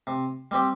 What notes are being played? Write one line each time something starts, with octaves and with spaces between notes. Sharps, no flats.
C3
G3 C4 G4